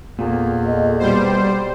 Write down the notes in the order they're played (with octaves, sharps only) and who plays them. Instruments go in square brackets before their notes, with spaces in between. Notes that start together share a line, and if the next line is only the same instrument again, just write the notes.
[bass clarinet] E2 [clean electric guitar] A#2 [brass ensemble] B3 A4
[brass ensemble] A4 D#5
[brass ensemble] B1 B2 [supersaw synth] G3 C5